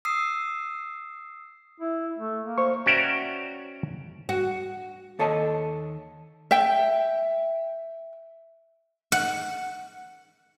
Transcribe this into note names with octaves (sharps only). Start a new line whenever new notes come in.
D#6 E6 C7
E4
A3
A#3
C5 C#6
C#4 F#4 D5 E5 G5 A#5
F#4
D#2 A4 C#5 D#5 A5
E5 G5
F#5